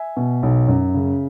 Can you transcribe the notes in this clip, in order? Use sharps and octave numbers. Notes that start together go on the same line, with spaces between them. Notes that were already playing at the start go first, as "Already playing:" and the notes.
Already playing: E5 G#5
B2
B1
F#2
C#3